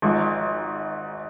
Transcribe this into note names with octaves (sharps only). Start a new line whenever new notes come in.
G#1 G#2 F3